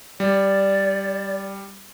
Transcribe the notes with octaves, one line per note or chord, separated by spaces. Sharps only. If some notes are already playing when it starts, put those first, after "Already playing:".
G3 D5